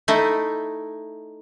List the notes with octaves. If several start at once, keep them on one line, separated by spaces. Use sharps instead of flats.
A3 D#4 E4